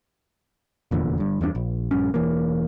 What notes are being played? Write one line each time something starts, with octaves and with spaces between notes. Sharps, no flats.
F1 E2 A#2 D3
G1 G2
E2 G2 B3 D4
A#1
A#1 G2 C#4
E1 E3 A#3